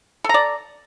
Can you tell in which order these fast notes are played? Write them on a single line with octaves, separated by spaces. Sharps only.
A4 A#5 D5